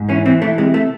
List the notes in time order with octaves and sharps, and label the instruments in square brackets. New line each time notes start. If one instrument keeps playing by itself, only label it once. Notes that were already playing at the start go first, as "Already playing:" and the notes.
Already playing: [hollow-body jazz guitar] G#2
E3 C#4
E3 C4
E3 A3
C3 G#3
A3